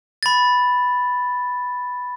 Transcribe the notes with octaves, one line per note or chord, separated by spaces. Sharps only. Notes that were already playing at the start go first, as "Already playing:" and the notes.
B5 A6